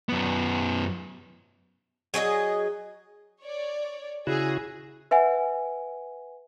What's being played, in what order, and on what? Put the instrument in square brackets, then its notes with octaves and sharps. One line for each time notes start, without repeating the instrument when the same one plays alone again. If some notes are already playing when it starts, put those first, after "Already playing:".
[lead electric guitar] F#2 B3
[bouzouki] F#3 G#4 A4 D#5
[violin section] C#5 D5
[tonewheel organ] C#3 E4 F#4 [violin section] G#4
[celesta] B4 E5 F#5 G#5